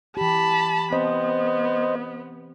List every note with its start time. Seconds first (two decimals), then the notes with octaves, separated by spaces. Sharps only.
0.17 E3 G4 A5 B5
0.92 B3 C4 C5 D#5